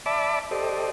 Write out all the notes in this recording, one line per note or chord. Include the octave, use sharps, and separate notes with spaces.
D5 E5 A5 B5 D6
G4 A4 C5 D5 D#5